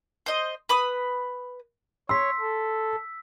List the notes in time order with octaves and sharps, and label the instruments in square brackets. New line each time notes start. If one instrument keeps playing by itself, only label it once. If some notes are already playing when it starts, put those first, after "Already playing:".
[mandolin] C5 D#5
B4 B5 D#6
[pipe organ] C#5 [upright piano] C6 [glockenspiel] E6 B6
[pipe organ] A4